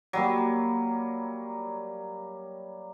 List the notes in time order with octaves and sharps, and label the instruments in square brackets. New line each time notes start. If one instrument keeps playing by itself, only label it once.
[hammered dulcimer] F#3 G3 A#3